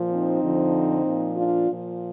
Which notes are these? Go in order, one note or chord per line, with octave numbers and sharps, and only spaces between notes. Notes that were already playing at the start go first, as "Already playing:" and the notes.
Already playing: A#2 F3
C4 D#4
F2 D3 F3
A#2 F3
D4 F4
A#2 F3